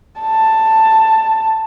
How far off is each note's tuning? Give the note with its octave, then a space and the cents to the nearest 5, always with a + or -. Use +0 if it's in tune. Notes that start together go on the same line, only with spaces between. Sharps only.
A5 +10